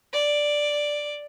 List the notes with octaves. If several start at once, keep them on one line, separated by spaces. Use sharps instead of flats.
D5